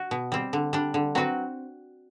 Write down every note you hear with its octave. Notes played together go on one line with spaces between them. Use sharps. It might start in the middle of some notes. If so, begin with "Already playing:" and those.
Already playing: F#4
B2
G3 C4
D3
G3 D4
D3
F#3 C4 F#4 B4